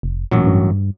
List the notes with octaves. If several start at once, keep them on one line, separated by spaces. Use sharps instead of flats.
F1
A1 F#2 A#2 F#3
G2